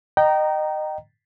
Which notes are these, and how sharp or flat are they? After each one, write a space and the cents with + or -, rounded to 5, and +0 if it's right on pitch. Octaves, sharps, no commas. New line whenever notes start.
D#5 -25 G5 -25 A#5 +0